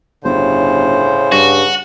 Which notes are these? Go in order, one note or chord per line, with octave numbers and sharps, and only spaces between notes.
G1 A2 C#3 C5
G2 F#4